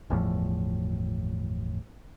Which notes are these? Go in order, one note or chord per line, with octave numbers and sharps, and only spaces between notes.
G1 E2 A2 F3